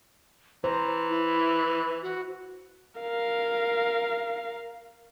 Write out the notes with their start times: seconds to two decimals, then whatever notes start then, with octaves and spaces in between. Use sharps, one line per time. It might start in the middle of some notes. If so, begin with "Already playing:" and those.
0.64 E3 C5 A#5
1.10 E4
2.02 F#4
3.00 A#4 F5